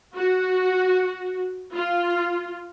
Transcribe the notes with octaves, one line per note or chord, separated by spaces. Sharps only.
F#4
F4